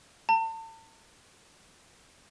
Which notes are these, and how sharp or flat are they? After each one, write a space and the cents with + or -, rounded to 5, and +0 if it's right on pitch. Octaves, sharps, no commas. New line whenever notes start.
A5 +35